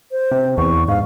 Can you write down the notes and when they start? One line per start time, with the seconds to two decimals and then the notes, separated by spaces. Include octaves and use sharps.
0.12 C5
0.31 C3
0.58 E2 C#6
0.88 G#2 F5